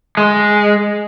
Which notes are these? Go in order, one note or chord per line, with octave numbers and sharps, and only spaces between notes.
G#3